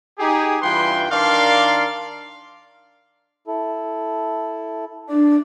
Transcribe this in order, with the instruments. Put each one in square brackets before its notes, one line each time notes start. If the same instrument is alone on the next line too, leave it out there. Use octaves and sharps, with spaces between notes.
[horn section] D#4 G4 G#4
G2 E3 F4 B4 G5 C6
D#3 D4 A#4 D5 F5 C6
[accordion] E4 A4
[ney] D4 [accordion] D5